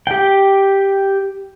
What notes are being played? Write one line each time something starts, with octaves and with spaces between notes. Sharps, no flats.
G4 G5